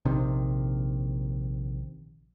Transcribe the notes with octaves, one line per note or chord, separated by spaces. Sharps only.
A#1 C3 D#3